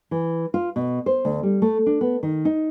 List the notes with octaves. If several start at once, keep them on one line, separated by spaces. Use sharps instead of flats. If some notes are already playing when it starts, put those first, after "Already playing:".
E3
F4
B2
C5
D2
G3
A3
D4
B3
D#3
D#4